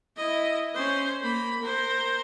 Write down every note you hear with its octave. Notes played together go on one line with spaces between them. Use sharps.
E4 D#5
C#4 C5
A#3 B5
A#4 C5